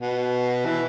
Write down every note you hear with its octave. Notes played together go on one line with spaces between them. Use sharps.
B2
E3